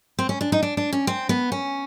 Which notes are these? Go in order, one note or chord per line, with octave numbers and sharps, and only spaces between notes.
C4
C#4
D4
D#4
D4
D4
C#4
C4
B3
C#4